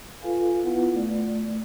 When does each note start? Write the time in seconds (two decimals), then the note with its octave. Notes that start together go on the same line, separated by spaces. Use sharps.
0.22 F4 A4 B4 F5 G#5
0.64 B3 E4 F4 B4 F#5
0.94 A3 D5